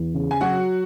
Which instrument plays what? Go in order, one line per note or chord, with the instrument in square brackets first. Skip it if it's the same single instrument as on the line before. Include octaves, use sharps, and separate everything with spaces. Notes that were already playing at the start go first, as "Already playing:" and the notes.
Already playing: [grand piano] E2
C#3
[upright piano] G#5
[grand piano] F#3 [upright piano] F#4 F#5